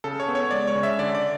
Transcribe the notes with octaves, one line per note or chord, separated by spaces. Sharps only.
C#3 A4
C#5
B3
C#5
G#3 D5
C#5
C#3
E5
D3 D5
D5